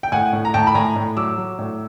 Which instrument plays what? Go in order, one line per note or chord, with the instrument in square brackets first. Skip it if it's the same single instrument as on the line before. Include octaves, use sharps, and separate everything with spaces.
[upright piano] G5
A2 F#5 G#5
A2
A#5
A2 G5 A5
B5
A2 G#5 A#5
A2
F#3 D6 E6
F#3
A2